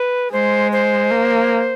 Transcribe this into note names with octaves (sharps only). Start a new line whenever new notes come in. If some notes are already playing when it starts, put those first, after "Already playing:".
Already playing: B4
G#3 C5
C5
A#3